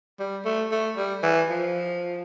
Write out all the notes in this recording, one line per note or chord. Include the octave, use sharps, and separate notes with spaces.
G3
A3
A3
G3
E3
F3